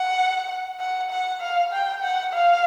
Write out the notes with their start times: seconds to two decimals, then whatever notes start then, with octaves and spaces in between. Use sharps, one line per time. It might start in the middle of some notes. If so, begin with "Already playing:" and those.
Already playing: F#5
0.80 F#5
1.10 F#5
1.41 F5
1.72 G5
2.02 F#5
2.33 F5